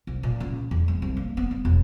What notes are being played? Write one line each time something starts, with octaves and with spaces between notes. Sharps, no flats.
C2
A#2
C#2
E2
G#3
C2
A#3
B3
G2
E1